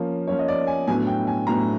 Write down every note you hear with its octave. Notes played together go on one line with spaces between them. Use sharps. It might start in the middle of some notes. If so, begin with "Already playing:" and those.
Already playing: F3 A#3 C#4
F3 A#3 C#4 C#5
D#5
D5
G#5
A2 F#3 B3 D4 G#5
G5
G#5
A2 F#3 B3 D4 A#5